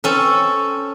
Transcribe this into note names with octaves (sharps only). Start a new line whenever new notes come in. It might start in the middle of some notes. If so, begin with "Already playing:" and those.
C4 C#4 A4